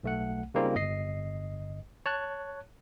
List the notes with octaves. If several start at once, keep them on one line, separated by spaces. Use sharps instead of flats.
B1 A3 F#5
C#3 G3 A#3 C4 D#4 F4
G1 D#5 C7
C#5 A5 F#6